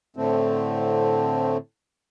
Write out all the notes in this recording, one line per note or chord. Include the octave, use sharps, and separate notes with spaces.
A2 D3 A3 C4